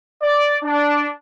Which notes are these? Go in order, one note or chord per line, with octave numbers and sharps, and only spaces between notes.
D5
D4